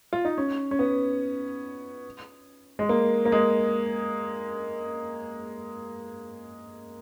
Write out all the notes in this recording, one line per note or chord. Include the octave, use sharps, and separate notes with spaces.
F4
D#4
C#4
C#4
B3
G#3
A#3
A#3
G#3